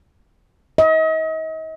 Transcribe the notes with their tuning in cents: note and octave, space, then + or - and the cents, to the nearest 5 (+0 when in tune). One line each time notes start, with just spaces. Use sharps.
D#5 +40